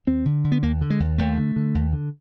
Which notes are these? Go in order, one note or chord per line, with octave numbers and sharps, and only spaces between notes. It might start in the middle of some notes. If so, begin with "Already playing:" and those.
D#2 C4
D3
D3
B3
D#2 A#3
D3
G#3
D#2
D#2 A3
D3
D3
D#2
D3